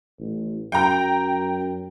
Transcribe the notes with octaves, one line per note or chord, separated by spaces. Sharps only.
A1
F#2 G5 A#5